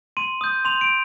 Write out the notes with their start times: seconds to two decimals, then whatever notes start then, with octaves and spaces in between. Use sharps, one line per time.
0.17 C6 D#7
0.41 D#6 G6
0.65 C6 F7
0.81 D7